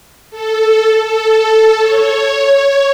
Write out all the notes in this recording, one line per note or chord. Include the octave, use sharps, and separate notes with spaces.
A4
A4
C#5